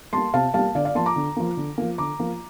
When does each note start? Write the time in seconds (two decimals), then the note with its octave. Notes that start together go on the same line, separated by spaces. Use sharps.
0.13 G3 A#3 A5 C6
0.34 C3 F5 A5
0.54 G3 A#3 F5 A5
0.75 D3 D5 F5
0.85 D5 F5
0.95 F3 A#3 A5 C6
1.06 A#5 D6
1.16 D3
1.36 F3 A#3
1.57 D3
1.78 F3 A#3
1.98 D3 A#5 D6
2.19 F3 A#3